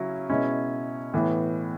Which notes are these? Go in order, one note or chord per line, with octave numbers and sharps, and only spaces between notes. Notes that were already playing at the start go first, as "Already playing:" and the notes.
Already playing: C#3 F#3 C#4 E4
B2 G#3 C#4 E4
A2 E3 B3